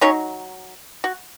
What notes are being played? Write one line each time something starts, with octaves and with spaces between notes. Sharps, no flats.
F#3 C#4 D#4 C#5
F#4